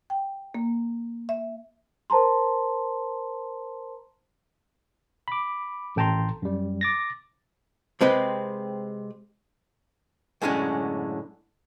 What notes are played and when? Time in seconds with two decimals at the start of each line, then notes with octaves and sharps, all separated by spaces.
0.10 G5
0.55 A#3
1.29 E5
2.10 A#4 C5 A5 A#5 C6
5.28 B5 D6
5.96 A1 A4 G5 A5 A#5 C6
6.42 F#2 G3
6.81 D6 A6 A#6
8.01 C3 G#3 C4 B4
10.42 F#2 A2 D3 G#3 C4 C#4